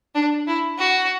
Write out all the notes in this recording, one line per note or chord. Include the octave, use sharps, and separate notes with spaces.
D4
E4
F#4